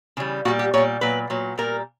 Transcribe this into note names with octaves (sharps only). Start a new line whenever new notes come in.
C#3 E3 G3
A#2 G3 F#4
G4
A#2 G3 C#5
A#2 F#3 B4
A#2 F#3
A#2 G3 A#4